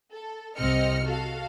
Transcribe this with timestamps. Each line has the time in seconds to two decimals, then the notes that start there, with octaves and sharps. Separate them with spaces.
0.14 A4
0.57 C2 C4 D#5 F6 C#7
1.05 F#4 A4 F5